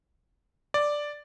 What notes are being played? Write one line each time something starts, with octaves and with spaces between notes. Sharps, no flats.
D5